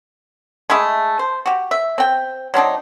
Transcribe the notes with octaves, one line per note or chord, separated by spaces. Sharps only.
G#3 A3 E4 G#4
C5
F#4 G4
E5
C4 G5
F#3 C4 D4 D#4